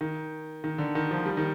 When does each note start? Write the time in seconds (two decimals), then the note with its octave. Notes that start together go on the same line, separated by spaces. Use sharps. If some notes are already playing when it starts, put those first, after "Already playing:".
0.01 D#3
0.64 D#3
0.78 D3
0.95 D#3
1.11 F3
1.25 G3
1.37 D#3